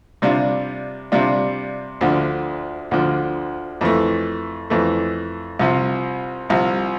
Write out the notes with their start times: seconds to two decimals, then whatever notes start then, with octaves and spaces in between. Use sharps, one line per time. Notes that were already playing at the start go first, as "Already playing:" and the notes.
0.22 C3 G3 D4 F4
1.12 C3 G3 D4 F4
2.01 D2 D3 F3
2.91 D2 D3 F3
3.81 F2 E3 A3
4.70 F2 E3 A3
5.59 C2 C3 F3
6.50 C2 C3 F3